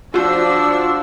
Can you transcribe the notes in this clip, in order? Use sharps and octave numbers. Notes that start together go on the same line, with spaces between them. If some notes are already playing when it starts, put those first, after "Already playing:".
F3 D4 F4 F#4 C5 E6